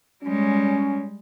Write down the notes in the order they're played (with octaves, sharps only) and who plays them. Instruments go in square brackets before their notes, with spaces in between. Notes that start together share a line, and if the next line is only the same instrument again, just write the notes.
[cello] G3 G#3 [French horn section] C#4